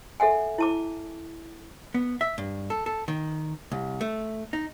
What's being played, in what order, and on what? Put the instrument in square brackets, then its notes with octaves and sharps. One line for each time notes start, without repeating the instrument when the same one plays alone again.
[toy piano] A4 E5 F#5 G#5
E4 A5 D6
[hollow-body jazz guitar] B3
E5
G2
A4
A4
D#3
C2
A3
D#4